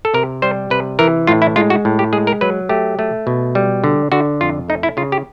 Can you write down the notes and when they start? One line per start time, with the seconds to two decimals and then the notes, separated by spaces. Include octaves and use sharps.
0.05 A4
0.14 C3 A#4
0.42 G3 C5
0.70 C3 B4
0.99 E3 A#4
1.27 A2 F4
1.42 E4
1.56 G#3 F4
1.70 F#4
1.85 A2
1.99 G4
2.13 G#3 G#4
2.27 A#4
2.41 F#3 B4
2.69 A3 G4
2.99 A3
3.27 B2
3.55 G3
3.84 D3
4.12 D3 F#4
4.41 F2 F4
4.68 A3 D#4
4.83 E4
4.97 C#3 F4
5.12 G4